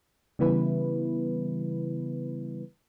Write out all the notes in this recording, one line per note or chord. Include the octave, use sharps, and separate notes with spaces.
C#3 E3 G3 B3 E4 B4